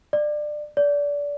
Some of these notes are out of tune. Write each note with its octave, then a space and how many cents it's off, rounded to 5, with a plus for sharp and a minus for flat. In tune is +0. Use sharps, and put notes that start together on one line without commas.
D5 +25
D5 -25